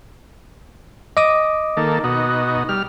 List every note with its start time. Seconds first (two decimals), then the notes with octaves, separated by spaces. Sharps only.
1.17 D#5 D6 D#6
1.77 D#3 A#3 A4
2.04 B2 D#4 F#4
2.69 G3 F6